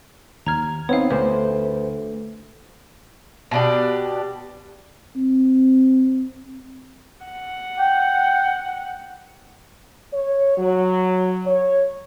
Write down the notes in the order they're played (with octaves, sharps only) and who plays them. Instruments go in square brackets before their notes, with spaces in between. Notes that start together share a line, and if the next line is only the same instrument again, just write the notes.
[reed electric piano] D#2 G#6 [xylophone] A#5 F6
[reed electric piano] B3 C4 D#4 [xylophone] C#5 F5
[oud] D2 [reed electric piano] B4 C5
[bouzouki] B2 D4 G4
[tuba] C4
[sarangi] F#5
[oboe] G5
[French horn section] C#5
F#3
C#5